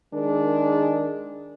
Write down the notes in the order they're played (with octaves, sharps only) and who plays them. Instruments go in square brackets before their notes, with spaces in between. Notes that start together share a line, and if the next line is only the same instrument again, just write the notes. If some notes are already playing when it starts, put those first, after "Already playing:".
[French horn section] D#3 G#3 D4 G#4 A#4